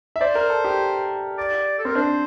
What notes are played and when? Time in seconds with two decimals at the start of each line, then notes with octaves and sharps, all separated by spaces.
0.16 E5
0.21 C5 D5
0.35 A#4
0.50 A4
0.65 G4
1.38 D5
1.79 A4
1.85 C4 A#4
1.95 D4 C5